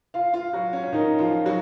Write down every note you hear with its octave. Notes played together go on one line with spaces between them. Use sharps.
F4 F5
F4 F5
F#3 F#4
C#4
C#4
D#3 D#4
F3 F4
F#3 F#4